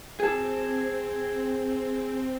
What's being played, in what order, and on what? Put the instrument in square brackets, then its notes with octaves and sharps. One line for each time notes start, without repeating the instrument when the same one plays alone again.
[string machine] C4 [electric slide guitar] G#4 A5